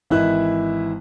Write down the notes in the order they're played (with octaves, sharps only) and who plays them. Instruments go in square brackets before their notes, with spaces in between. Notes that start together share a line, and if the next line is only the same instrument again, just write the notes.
[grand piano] G#1 E3 E4 D#5 E5 F#6